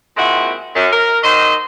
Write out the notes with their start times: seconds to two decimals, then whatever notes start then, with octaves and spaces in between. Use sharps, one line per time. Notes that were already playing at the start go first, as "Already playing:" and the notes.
0.17 A#2 G#3 C4 E4 F#4
0.75 F#2
0.92 A#4
1.23 D#3 F#3 C5 D#5